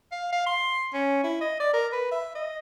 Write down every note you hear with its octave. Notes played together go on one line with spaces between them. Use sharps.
F5
F5
C6
C#4
E4
D#5
D5
A#4
B4
E5
D#5